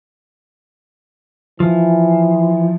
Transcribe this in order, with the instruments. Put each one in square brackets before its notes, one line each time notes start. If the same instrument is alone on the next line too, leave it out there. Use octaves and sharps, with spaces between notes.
[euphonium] E3 [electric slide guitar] F3